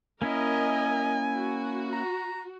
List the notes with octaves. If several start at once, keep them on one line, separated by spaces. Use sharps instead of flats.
A#3 C#4 E4 A#4 D#5 G#5
F#4
A#5